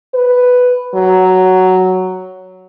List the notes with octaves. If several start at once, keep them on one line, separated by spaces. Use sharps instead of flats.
B4
F#3